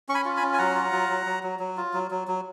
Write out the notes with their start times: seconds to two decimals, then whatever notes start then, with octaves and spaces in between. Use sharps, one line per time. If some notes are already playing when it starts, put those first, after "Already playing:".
0.09 C#4 C#6
0.15 G#5 B5
0.25 F4
0.37 G#5 B5
0.42 C#4
0.54 G#5
0.58 F#3 F#5 A#5
0.75 F4
0.92 F#3
1.10 F#3
1.26 F#3
1.43 F#3
1.60 F#3
1.77 F4
1.94 F#3
2.11 F#3
2.28 F#3